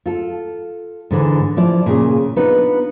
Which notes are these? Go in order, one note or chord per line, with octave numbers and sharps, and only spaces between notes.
F4 A4
G#2 D3 E3 G#5
F3 E4 D5
A#2 C#3 G#4
B3 D4 D#4 F4 B4